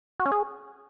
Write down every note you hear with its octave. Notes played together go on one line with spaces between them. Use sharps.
F#4
C#4
G#4